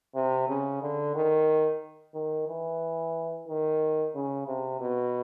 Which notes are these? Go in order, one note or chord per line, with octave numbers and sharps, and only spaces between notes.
C3
C#3
D3
D#3
D#3
E3
D#3
C#3
C3
B2